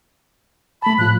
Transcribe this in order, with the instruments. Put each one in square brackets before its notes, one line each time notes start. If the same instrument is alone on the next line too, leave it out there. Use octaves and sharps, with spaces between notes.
[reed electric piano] A3 A5 [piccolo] B5
[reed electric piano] A2 F3 F4 [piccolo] F#6